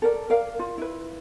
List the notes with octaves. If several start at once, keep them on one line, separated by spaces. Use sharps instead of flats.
A4 A#4 D5
A#4 D5 F5
F4
E4 B4